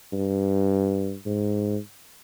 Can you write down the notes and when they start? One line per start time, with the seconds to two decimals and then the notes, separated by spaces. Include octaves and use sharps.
0.13 G2
1.26 G#2